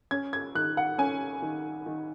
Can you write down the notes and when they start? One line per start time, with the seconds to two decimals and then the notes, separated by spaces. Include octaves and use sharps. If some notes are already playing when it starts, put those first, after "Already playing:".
0.11 C#4 G#6
0.33 G#6
0.55 D#3 F#6
0.77 F#5
0.98 C#4 G#5
1.42 D#3
1.86 D#3